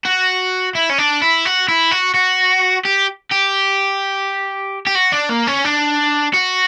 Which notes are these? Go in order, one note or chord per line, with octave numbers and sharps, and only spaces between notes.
F#4
E4
C#4
D4
E4
F#4
E4
F#4
F#4
G4
G4
G4
F#4
D4
A#3
C#4
D4
F#4